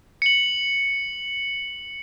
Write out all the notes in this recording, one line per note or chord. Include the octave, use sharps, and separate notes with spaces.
C#7 F#7